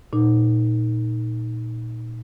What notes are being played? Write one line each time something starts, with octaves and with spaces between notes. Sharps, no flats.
A#2 D#4